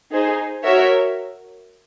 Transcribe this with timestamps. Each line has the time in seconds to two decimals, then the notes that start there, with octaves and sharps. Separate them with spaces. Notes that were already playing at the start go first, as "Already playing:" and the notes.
0.12 D#4 G#4 C5
0.64 F#4 A#4 C#5 E5